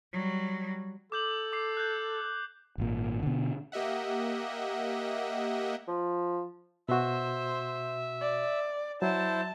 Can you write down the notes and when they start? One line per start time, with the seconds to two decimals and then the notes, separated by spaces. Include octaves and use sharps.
0.13 F#3 G3
1.12 A4 D6 G6 F#7
1.53 D6 C7
1.77 F#6 G6
2.78 G#1 A#2
3.23 B2 D3
3.72 A#3 G4 D#5 E5 F#5
5.87 F3
6.89 B2 F#4 C5 E5
8.21 D5
9.02 F#3 E4 C5 A5